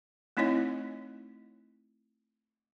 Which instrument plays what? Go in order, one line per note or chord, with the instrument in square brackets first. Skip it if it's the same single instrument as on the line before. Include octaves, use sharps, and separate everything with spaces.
[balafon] A3 C4 D#4 E4 C#5 D#5